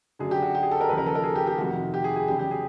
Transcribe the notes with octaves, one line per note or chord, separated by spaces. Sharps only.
F#2 D3 F#3 G#4
G4
F#4
G4
G#4
A4
A#4
D#2 C#3 F3 B4
A#4
A4
A#4
G#4
G4
G4
F2 C3 D#3 F#4
G4
G#4
G#4
E2 C#3 F#3 G4
G4
G#4